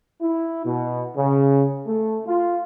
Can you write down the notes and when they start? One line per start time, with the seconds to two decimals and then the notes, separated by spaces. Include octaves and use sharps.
0.21 E4
0.64 B2
1.17 C#3
1.87 A3
2.27 F4